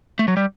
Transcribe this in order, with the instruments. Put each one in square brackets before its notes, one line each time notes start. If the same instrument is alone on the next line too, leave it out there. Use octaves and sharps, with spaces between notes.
[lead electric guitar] A3
F#3
G3